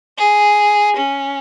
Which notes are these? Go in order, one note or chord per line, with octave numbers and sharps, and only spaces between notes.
G#4
C#4